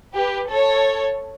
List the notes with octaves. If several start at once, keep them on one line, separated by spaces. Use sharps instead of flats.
G4 B4
A4 C#5